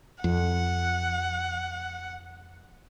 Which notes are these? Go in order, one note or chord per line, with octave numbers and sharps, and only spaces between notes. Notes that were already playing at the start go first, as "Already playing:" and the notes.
F2 F#5